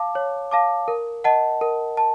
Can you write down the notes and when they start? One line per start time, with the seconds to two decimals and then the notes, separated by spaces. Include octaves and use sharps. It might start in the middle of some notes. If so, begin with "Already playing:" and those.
Already playing: F5 A5 D6
0.15 C#5
0.51 F5 A5 D6
0.88 A#4
1.24 D#5 F#5 A5
1.61 A#4
1.97 A5